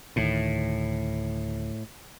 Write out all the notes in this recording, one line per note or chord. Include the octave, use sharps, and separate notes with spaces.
D2 A2 D#3